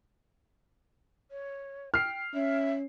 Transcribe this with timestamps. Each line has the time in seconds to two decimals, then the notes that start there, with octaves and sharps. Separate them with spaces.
1.31 C#5
1.94 G5 F6 C7
2.34 C#4 E5